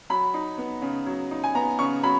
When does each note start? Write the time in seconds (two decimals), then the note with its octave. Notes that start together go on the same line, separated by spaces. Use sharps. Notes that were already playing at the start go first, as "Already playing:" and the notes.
0.10 F#3 B5
0.34 D#4
0.58 B3
0.82 C#3
1.06 F#3
1.31 D#4
1.44 G#5
1.55 B3 A#5
1.79 C#3 C#6
2.03 F#3 B5